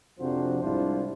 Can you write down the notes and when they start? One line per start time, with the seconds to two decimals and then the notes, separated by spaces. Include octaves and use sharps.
0.19 F2 C3 F3 D4 F#4 C5
0.62 C2 G#2 D4 E4 F4 C5